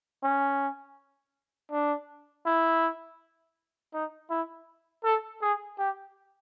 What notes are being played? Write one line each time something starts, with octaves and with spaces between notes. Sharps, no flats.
C#4
D4
E4
D#4
E4
A4
G#4
G4